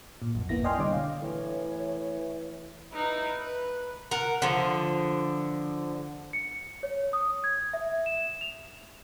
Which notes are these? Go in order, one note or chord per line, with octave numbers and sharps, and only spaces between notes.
A#2
B1 F2
G1 A#3 B3 E4 A#6
D5 D#5 G5 G#5 C6 F6
B2 D3 G3 C#5 D6
F5
A2 E3 C#5
D#4 E4 B4
B4
A#4 F#5
D3 F3
C#7
C#5
D#6
G#6
E5
E7
F7